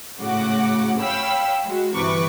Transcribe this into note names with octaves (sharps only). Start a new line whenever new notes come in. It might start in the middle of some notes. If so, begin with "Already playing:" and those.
G#1 A2 C#3 F#4 F#5 D6
C#5 F5 G5 B5 E6
G#3 F#4
G1 C3 E3 B4 C#6 D6